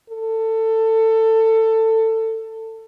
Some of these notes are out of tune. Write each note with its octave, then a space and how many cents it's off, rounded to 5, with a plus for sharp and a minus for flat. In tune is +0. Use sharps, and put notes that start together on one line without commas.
A4 +20